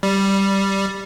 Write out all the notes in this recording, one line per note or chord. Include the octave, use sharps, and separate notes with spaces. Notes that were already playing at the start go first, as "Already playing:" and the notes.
G3